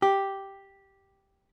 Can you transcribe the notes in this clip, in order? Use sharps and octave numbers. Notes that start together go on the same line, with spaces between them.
G4